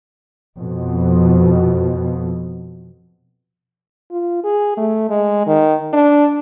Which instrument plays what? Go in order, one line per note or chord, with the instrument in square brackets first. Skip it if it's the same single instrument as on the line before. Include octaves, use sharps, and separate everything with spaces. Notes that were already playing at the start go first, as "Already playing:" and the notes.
[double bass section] F2 B2
[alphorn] F4
G#4
A3
G#3
D#3
D4